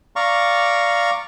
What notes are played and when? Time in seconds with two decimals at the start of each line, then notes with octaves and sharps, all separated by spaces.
0.16 D5 F5 A#5 C#6